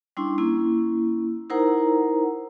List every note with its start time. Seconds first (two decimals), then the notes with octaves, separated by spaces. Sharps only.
0.17 G3 C#4 D4 E4 C6
0.38 A#3 C#4 E4
1.50 D#4 E4 A#4 C5 F#5 A#5